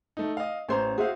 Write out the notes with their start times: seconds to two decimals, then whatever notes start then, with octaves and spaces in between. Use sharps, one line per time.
0.17 A3 D#4
0.37 D#5 F5
0.69 A1 C#4 C5 A#5
0.98 F#4 G#4 C5 E5 F5